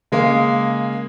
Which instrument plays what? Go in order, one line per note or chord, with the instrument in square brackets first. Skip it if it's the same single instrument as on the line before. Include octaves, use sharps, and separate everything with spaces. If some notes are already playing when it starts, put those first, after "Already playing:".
[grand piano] C#3 G#3 A#3